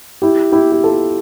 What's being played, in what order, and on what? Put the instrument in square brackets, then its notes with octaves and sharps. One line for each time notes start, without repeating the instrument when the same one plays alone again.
[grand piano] E4 G4
E4 G4
G4
F4 A4